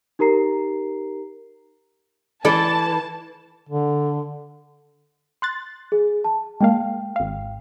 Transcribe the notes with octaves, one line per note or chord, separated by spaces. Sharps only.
D#4 G4 A#4 A#5 C7
E3 A4 D5 A5
D3
C6 F#6 A6
G#4
A5
G#3 A#3 F5 G5
G#1 F5